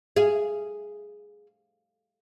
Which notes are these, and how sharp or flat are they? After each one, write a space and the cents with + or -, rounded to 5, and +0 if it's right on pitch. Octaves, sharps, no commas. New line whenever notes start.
G#4 +0 F5 -20